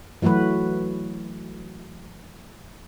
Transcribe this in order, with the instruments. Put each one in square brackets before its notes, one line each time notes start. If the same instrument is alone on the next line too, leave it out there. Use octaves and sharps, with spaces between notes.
[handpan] E3 F#3 A3 F#4 B4